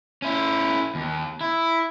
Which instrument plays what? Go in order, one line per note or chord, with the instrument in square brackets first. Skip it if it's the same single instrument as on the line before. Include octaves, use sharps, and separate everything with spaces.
[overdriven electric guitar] C#4 E4
D#2
E4